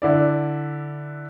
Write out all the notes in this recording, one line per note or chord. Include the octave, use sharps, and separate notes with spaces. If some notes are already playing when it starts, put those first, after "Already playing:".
D3 E4 D5